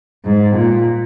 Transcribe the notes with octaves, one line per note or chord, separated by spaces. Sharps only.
G#2
A#2